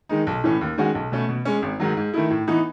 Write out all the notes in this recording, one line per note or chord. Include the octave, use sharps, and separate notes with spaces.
D#3 G#3 D#4
B1
A2 E3 A3 C#4
D#2
D#3 G#3 C#4 F#4
B1
B2 A3 C#4
B2
G#3 C#4
G#1
G#2 D#3 F#3
G#2
D#3 A3 E4
A2
E3 B3 D#4